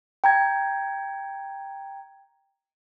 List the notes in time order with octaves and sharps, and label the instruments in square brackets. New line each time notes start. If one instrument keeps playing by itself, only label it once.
[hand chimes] G5 A#5 G#6